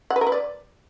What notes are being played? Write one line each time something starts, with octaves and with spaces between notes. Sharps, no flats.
F#5
B4
A#4
B4
D5